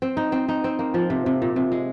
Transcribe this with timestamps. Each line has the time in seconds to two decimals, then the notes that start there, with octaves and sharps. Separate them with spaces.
0.02 C4
0.17 D#4
0.32 C4
0.48 D#4
0.64 C4
0.79 A#3
0.94 F3
1.10 C3
1.26 C3
1.42 A#2
1.56 C3
1.72 G#3